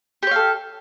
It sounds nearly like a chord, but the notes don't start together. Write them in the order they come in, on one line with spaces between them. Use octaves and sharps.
G4 C#5 F5 A4